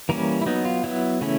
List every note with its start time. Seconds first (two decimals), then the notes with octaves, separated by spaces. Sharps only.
0.09 E3 G3 A#3 C#4 A#4
0.42 E4
0.46 F#3 B3 D#4
0.65 F4
0.84 F#3 B3 E4
1.21 C#3 E3 A3 C#4 E4